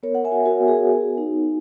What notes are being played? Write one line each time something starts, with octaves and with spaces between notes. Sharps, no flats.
B3 A#4 C#5
F#5
E5 G#5
F#4
F#4 A#4
B3
G#4
B3
D#4